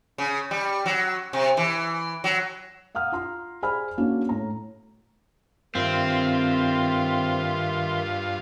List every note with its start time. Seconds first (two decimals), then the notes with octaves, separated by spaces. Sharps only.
0.18 C#3
0.51 G3
0.86 F#3
1.33 C3
1.57 E3
2.24 F#3
2.95 F5 F#5 D#6 F6
3.12 F4 A#5 C6
3.62 G#4 C5 D5 G#5 B5 F6
3.98 A#3 C#4 D4 F#4
4.29 A2 A#5
5.75 G2 D#3 C4 F4 E5 C6